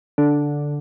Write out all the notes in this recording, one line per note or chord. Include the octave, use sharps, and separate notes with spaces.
D3